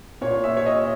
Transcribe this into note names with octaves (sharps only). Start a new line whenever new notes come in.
A#2 C#5
E5
C#5
D#5